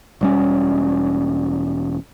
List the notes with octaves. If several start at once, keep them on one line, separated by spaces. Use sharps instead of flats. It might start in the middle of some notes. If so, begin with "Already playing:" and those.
E1 G3 C#4